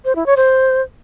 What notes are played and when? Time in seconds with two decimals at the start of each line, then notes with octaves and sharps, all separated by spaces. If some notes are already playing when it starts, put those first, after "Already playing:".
0.05 C5
0.16 E4
0.26 C#5
0.37 C5